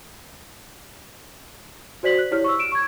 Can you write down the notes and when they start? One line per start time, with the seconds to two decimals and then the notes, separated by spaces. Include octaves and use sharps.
2.03 F#4 C5 D5 B6 F#7
2.18 F#6
2.31 E4 G4 C#5 F6
2.44 C#6 E6
2.59 D7 E7
2.72 C#6 G#6